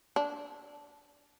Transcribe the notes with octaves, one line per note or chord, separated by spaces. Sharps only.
D4